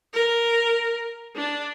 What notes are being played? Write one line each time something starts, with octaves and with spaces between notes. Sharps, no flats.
A#4
D4